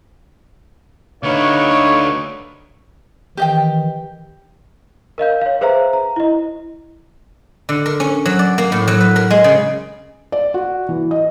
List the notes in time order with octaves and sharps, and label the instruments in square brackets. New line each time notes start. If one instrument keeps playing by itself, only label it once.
[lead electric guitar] D3 A3 [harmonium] D#4 B4 F5 [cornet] C#5
[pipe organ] D#3 E3 [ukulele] G4 D#5 G5
[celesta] A#4 D#5 F5 G6
C#5 F5
G#4 B4 C5 E5 F5 A#5
A#5
E4 D#5
[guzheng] D3
A#4
C#4
F#3
D5
A#3
A2
F#3
B4
A#4
G#3
C#3
[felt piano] D5
F#4
E3
D#5